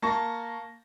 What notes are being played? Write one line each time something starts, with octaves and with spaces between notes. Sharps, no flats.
A#3 A5 C#6 A#6